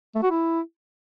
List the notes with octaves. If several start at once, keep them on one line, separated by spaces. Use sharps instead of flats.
A3
F#4
E4